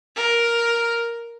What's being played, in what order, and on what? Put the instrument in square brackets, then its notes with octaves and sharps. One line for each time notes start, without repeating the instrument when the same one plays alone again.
[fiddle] A#4